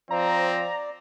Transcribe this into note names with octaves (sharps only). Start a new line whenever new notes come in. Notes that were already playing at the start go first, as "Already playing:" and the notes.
F3 C4 D5 A#5